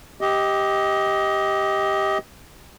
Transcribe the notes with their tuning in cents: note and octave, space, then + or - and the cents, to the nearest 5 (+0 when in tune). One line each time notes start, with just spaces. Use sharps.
G4 +0 D#5 +20